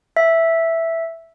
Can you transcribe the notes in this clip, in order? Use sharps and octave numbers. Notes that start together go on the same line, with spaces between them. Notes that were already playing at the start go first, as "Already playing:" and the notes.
E5